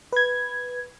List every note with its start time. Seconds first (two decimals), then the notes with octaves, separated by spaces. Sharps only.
0.13 B4 G#6